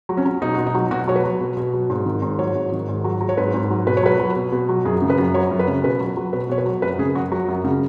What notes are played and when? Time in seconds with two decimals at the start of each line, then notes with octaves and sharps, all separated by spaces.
0.09 F#3
0.17 C#4
0.25 F#3
0.42 B2 D#4
0.54 B2 F#4
0.66 D#4
0.74 F#3
0.91 B2 F#4
1.07 F#3 C#5
1.16 B4
1.24 F#3
1.41 B2
1.57 B2
1.73 F#3
1.90 G#2
2.06 D#3
2.22 G#2
2.39 F#3 C#5
2.56 G#2
2.72 D#3
2.89 G#2
3.04 F#3
3.21 F#3
3.29 C#5
3.37 G#2 B4
3.54 G#2
3.70 F#3
3.87 B2 B4
3.97 C#5
4.03 F#3 B4
4.20 F#3
4.36 B2
4.52 B2
4.69 F#3
4.85 F#2 G#4
5.02 C#3
5.10 B4
5.18 F#2
5.34 F#3 C#5
5.51 F#2
5.59 B4
5.68 C#3
5.84 B2 B4
6.00 F#3
6.17 F#3
6.33 B2 B4
6.49 B2 C#5
6.58 B4
6.66 F#3
6.82 F#2 B4
6.99 C#3 G#4
7.15 F#2 F#4
7.32 F#3 F#4
7.48 F#2
7.64 C#3